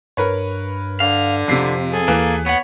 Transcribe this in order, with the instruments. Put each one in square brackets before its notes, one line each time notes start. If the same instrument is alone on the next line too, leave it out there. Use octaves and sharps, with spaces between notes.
[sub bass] G2 [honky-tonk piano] A#4 B4 C#5
[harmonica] D3 [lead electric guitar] F5
[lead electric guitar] F2 [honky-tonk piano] C3 B6 C7
[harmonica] G#4 A4
[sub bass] D#2 [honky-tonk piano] E3 [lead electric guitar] A#3
[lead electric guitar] B3 F#5 [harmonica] C#5